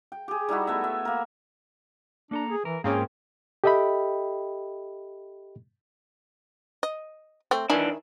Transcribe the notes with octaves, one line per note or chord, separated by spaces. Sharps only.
G5
G4 G#4
G3 D#4 E4 F#4
A3 B3 E5
E5
A#3 A#4
A#3 D4 A4 A#5
G#4
E3 A#4
G#2 A#3 C4 C#4 F4 G#4 G5
G4 A4 D#5 E5 G5 B5
D#5
A3 C4
D#3 E3 D4 E4 G#5